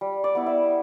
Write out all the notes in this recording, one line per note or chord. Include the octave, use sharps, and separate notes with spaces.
G3
D5
B3 E4
E5